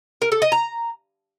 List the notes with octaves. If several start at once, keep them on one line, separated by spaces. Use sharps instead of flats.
A#4
A4
D#5
A#5